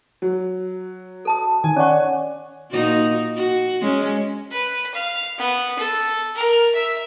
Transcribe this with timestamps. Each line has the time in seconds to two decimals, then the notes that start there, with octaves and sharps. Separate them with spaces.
0.22 F#3
1.25 A4 A5 D#6
1.64 D#3 G#5
1.76 C#4 C#5 D5 F#5 C#6
2.70 A#2 D#4 F#4
3.36 F#4
3.81 G#3 C#4
4.52 B4
4.94 F5
5.39 B3
5.79 A4
6.36 A#4
6.75 E5